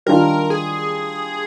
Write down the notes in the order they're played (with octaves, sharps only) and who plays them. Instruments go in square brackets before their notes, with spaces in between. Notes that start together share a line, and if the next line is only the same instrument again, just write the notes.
[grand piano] D#3 G3 D4 F4 [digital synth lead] A#4
[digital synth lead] G#4